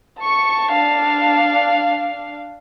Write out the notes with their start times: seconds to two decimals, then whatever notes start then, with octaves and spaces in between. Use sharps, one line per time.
0.23 A5 C#6
0.72 D4 F5